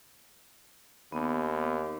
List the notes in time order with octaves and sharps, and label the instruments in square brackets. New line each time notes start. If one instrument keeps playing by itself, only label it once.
[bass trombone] D#2 [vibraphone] B3